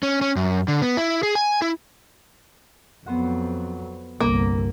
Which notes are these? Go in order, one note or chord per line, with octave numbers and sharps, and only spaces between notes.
C#4
C#4
F#2
D3
B3
E4
G#4
G#5
E4
F2 F#3 B3 C5 F#5
G1 C2 A#3